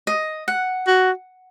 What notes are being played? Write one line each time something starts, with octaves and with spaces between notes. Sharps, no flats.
D#5
F#5
F#4